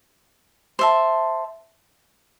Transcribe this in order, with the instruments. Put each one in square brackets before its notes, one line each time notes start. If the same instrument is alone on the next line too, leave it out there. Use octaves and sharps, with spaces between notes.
[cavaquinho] C5 E5 A5